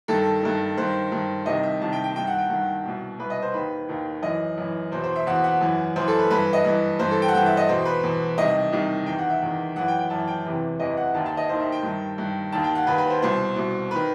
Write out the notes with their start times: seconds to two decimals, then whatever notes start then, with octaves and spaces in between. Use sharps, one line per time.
0.08 G2 D#3 A4
0.42 G2 D#3
0.77 G2 D#3 C5
1.11 G2 D#3
1.46 C2 C3 D#3 D#5
1.63 E5
1.81 C2 C3 D#3 A5
1.93 G5
2.04 G5
2.15 G2 D#3 G5
2.27 F#5
2.38 G5
2.50 G2 D#3 F#5
2.85 C2 B2
3.19 C2 B2 B4
3.30 D#5
3.42 C5
3.54 D#2 D#3 B4
3.89 D#2 D#3
4.22 F#2 E3 D#5
4.58 F#2 E3
4.92 E2 B2 C5
5.04 C5
5.16 E5
5.27 E2 B2 F#5
5.44 F#5
5.61 F#2 E3
5.96 F#2 E3 C5
6.08 A4
6.19 B4
6.30 G2 E3 B4
6.53 D#5
6.65 G2 E3
6.99 G2 E3 C5
7.11 A4
7.22 G5
7.28 F#5
7.33 G2 E3 G5
7.46 E5
7.57 D#5
7.69 E2 B2 C5
7.85 B4
8.03 E2 B2
8.38 C2 C3 D#3 D#5
8.72 C2 C3 D#3
9.06 E2 D#3 G5
9.18 F#5
9.30 E5
9.42 E2 D#3
9.76 F#2 E3 F#5
9.88 G5
9.99 G5
10.10 F#2 E3 A5
10.27 G5
10.45 E2 C3 E3
10.80 E2 C3 E3 D#5
10.97 F#5
11.14 D#2 D#3 A5
11.26 A5
11.37 D#5
11.49 D#2 D#3 C5
11.60 E5
11.72 G5
11.83 G2 D#3
12.18 G2 D#3
12.52 D#2 D#3 A5
12.64 G5
12.75 F#5
12.87 D#2 D#3 B4
12.98 B4
13.10 C5
13.22 C2 B2 C5
13.56 C2 B2
13.91 D#3 B4